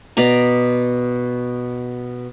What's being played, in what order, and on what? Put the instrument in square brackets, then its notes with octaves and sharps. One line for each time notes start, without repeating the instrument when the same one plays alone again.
[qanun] B2 D5 A#5